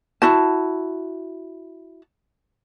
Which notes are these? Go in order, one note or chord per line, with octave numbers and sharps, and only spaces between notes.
E4 F#4 A5